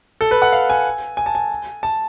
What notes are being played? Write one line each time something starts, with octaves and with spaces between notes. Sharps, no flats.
A4
B4
F#5
F5
G#5
G#5
A5
G#5
A5